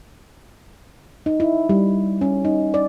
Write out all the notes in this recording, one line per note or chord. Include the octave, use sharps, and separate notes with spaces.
D#4
E4
G3
C#4
D#4
D5